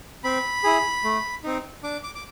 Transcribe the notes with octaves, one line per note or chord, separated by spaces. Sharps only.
C4 B5
E4 G#4
A3
C4 D#4
D4 D6
D6
D6